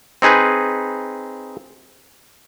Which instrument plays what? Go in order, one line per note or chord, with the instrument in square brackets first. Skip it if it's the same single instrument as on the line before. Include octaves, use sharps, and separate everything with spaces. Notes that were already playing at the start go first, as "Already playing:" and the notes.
[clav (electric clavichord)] C4 D#4 G#4 B4